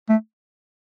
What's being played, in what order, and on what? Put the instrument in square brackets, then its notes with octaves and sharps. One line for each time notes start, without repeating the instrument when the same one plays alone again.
[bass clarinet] A3